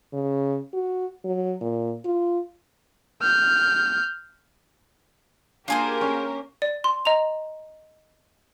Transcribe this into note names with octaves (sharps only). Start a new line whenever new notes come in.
C#3
F#4
F#3
A#2
F4
F6 G6
A#3 D4 F4 G4 G#4 A#4 C5
C#4
D5
C6
D#5 A#5 F7